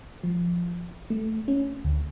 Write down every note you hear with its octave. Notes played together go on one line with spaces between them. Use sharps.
F3
A3
C#4
D2